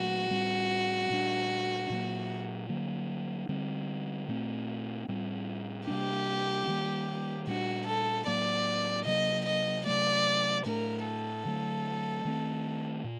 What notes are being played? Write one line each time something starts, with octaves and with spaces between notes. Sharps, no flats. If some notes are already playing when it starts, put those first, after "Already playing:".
Already playing: A#2 F#3 A3 F#4
A2 G3 C4
A#2 G3 D4
A#2 F#3 A#3
D3 F#3 A#3
D3 G3 C4
A#2 A3 C4
A2 G3 C4
C3 G3 A#3 D4 G4
D#3 G3 A#3
A#2 G3 A#3 D4 F#4
A4
A2 F#3 A#3 D5
C3 F#3 A#3 D#5
D#5
C3 F#3 A3 D5
A2 A3 D4 A#4
A4
D3 F#3 A3
D#3 A3 C4
A#2